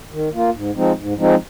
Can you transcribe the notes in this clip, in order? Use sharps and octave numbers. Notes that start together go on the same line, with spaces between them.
D#3
A#3 F4
G#2
F3 G#3 C4 D#4
G#2
F3 G#3 C4 D#4